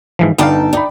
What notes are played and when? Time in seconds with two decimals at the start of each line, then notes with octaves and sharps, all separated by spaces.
0.19 G#2 E3 F3
0.38 G1 B3 D#4 D5 F5 G5 A5
0.73 D#4 D5 B5